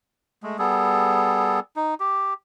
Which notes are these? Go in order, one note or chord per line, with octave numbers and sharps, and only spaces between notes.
G#3 A3
G3 B3 G#4 A4
D#4
G4